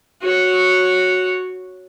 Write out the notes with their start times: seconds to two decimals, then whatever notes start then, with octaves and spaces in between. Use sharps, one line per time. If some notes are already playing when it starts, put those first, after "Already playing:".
0.22 F#4 C#5